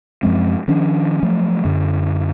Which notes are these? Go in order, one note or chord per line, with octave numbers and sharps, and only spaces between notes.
F#2 F3 G#3 C4
D#3 F3 C#4 D4
F3 F#3 A3
F#2 D3